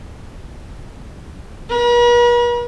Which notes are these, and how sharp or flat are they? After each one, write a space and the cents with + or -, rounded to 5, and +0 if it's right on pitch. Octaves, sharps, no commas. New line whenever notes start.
B4 -45